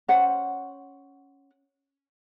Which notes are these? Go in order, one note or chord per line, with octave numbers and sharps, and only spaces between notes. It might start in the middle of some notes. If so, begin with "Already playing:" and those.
C#4 C5 F#5